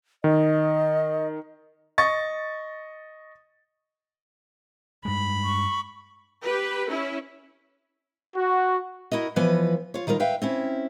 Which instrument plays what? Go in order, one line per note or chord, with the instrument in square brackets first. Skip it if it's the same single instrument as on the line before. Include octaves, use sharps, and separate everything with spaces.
[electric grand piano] D#3 [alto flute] D#5
[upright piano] D#5 C#6 A6
[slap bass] G2 G#3 [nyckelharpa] B5
[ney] C#6
[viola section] G4 B4
C#4 E4
[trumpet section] F#4
[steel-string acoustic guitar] E4 F#4 A#4 D#5
E3 F3 B3 B4 D#5
F4 C#5
D#3 G3 F4 A#4
B4 E5 F5 G5
C4 C#4 E4